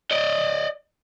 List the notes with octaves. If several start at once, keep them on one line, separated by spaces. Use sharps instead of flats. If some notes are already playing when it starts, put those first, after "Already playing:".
D5 D#5